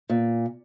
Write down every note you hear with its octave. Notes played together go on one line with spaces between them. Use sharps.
A#2